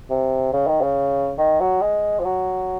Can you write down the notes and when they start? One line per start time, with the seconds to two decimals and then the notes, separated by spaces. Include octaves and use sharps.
0.10 C3
0.53 C#3
0.67 D#3
0.81 C#3
1.38 D#3
1.60 F#3
1.81 G#3
2.19 F3
2.24 F#3